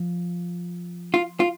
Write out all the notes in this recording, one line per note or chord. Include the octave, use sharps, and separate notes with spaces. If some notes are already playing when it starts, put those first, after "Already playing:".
Already playing: F3
F4
F4